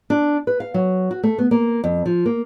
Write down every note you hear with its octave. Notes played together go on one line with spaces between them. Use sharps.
D4
B4
F5
F#3
F#4
A3
B3
A#3
F2
F3
A#3